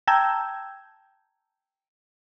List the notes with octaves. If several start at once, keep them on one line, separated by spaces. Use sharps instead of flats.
G5 A5 A#5 E6 G6 G#6